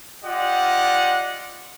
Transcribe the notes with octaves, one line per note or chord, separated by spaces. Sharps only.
F4 G4 D5 D#5 F#5